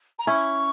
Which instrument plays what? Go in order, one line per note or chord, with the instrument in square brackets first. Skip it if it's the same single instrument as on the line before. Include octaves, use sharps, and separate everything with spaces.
[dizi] A#5
[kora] C#4 E4 [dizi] C#6